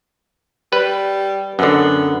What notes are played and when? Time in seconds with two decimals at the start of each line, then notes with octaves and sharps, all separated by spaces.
0.73 G3 B4
1.59 F#2 D3 B3